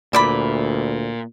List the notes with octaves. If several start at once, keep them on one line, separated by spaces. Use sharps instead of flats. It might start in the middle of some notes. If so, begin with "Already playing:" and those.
D2 A#2 E3 D5 B5